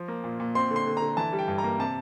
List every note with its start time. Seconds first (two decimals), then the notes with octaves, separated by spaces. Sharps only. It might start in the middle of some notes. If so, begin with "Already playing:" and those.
Already playing: F3
0.08 A#3
0.24 A#2
0.40 A#2
0.55 C4 C6
0.71 D3
0.76 C6
0.87 D3
0.97 D3 A#5
1.17 E3 A5
1.33 G3
1.39 G5
1.48 G2
1.58 A#5
1.64 A#3
1.79 C3 A5